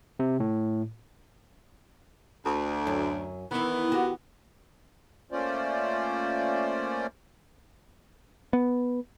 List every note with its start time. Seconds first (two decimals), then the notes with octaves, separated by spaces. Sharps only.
0.19 C3
0.40 A2
2.46 D2
2.87 F#2
3.51 D#3 E3 B3 E4
3.92 F#4 G4
5.32 A3 A#3 C#4 F4 C5 D5
8.53 B3